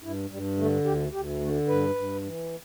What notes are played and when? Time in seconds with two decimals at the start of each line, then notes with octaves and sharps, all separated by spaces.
0.03 G2 E4
0.30 G2 G3
0.57 D3 A3
0.85 D2 G4
1.12 D2 G4
1.40 D3 A3
1.68 G2 B4
1.95 G2
2.23 E3